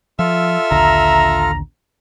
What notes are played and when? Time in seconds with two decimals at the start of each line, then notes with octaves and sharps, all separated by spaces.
0.19 F3 F4 A4 E5 F6
0.71 A#1 D#2 D3 A#5